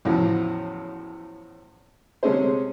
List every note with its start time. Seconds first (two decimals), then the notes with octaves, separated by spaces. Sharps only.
0.05 E2 A2 C#3 F3 F#3
2.23 C3 G#3 A3 C#4 G#4 C5